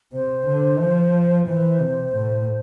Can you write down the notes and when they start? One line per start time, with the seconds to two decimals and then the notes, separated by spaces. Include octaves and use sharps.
0.13 C3 C5
0.47 D3
0.80 F3
1.47 E3 C5
1.81 C3
2.15 A2